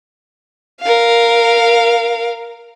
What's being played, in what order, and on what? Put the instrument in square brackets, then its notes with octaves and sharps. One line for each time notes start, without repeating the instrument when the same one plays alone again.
[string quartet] A#4 F5